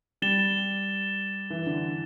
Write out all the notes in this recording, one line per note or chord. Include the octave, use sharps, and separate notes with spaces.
G3 A6 E7 G7
E3
D3